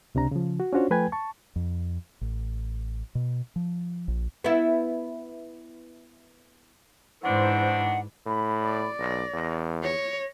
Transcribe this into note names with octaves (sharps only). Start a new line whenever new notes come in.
C#2 C3 D4 A#5
C#3 F3
F#4
C#4 D4 F4 F#4 C5 C#5
F3 A3 B4 G5 G#5 G#6
A5 C#6
F2
A1
B2
F3
A#1
B3 E4
G#2 D#3 E3 D4 C5 F#5
A2 B5
D5
B1 A#6
E2
C#5 A#6